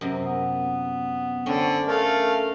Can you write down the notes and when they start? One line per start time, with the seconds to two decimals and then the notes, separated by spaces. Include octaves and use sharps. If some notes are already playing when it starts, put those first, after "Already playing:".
0.01 F#2 C3
0.24 B3
1.46 D3 C4 C#4
1.87 A3 A#4 F5